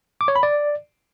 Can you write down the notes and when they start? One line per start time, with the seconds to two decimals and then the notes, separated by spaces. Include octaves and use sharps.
0.21 D6
0.28 C#5
0.36 B5
0.43 D5